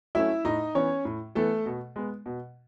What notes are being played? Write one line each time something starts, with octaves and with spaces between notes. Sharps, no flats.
F#3 A3 C#4 E4 E5
A2 D#4 D#5
E3 B3 C#4 C#5
A2
E3 A3 B3 A4
B2
G#3 B3
B2